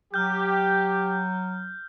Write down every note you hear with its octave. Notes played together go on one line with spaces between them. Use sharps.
F#3 G4 F6 G6